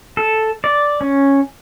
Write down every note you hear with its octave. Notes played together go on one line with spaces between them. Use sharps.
A4
D5
C#4